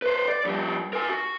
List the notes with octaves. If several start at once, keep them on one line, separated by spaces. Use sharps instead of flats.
B4 C5
D5
F2 G3
A#4 G#5
F#4